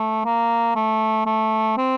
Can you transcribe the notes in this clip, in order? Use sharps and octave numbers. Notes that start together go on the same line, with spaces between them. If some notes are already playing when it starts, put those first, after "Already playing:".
Already playing: A3
A#3
A3
A3
C4